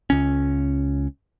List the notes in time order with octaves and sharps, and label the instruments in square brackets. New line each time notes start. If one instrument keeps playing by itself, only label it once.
[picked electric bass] C#2 C#4